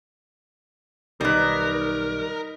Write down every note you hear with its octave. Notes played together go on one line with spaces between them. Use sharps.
B1 D#3 G3 D#4 A#4 B4